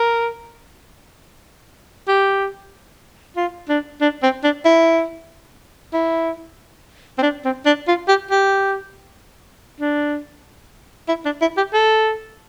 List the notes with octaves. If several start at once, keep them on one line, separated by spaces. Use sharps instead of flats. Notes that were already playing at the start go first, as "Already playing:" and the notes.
Already playing: A#4
G4
F4
D4
D4
C4
D4
E4
E4
C4
D4
C4
D4
F4
G4
G4
D4
E4
D4
E4
G4
A4